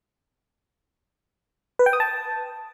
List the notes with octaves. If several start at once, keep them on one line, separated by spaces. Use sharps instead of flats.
B4
G5
D#6
A5